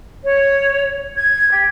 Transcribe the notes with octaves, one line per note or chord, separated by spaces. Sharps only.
C#5
G#6
G4